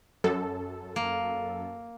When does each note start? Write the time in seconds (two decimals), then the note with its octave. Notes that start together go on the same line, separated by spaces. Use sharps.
0.24 F#2 A4
0.96 A#3